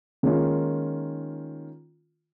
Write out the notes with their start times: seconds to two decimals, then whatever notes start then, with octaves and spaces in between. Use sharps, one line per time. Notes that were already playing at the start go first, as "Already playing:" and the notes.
0.23 D#3 G#3 A#3 C#4 D#4 F4